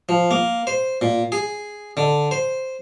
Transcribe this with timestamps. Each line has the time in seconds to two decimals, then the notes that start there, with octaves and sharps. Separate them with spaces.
0.09 F3
0.31 A#3
0.67 C5
1.01 A#2
1.32 G#4
1.97 D3
2.31 C5